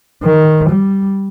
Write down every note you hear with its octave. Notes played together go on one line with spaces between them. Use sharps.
D#3
G3